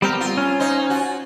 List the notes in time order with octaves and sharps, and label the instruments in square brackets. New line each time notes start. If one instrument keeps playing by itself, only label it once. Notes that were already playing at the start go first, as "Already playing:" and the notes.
[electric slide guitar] G3 C4 A#4 [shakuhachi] B3 [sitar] G4
[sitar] F4
[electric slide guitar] C#4 [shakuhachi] G#5
[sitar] D#4 C5
F4 F#4